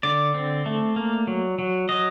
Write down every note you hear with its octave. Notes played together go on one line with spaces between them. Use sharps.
D3 D5
C4
A3
A#3
F#3
F#3
F#3 D#5